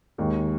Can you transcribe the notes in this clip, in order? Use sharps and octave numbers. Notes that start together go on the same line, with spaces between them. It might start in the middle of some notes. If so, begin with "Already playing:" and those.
D#2 D#3 G#3